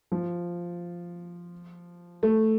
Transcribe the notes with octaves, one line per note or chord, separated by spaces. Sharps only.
F3
A3